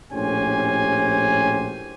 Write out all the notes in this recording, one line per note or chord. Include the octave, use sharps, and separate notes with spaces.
A#1 A2 C#4 G4 C5 G#5